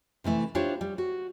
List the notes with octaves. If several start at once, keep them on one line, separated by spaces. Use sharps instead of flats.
C3 E3 A3 E4
D4 E4 F4 G4 C5 C#5
G3
F#4